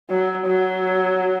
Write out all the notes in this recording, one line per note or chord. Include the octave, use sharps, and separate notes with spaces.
F#3
F#3